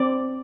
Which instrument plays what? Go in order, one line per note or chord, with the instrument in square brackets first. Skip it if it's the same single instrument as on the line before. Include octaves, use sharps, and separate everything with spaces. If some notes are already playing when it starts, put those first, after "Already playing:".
Already playing: [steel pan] C4 D5